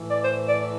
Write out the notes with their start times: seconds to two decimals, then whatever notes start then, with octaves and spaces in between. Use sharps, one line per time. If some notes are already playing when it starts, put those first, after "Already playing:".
Already playing: A2 E3
0.10 D5
0.24 C5
0.47 D5